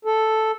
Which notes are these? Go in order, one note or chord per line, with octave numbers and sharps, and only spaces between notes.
A4